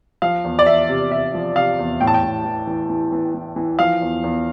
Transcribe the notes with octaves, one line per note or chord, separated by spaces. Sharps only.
F3 F5
E2
D5
E2 E5
C3
C3 E5
F3
C3 F5
E2
A2 G5
A5
G5
A2
E3
E3
E3
E3
E3
E3
F3 F5
E2
E2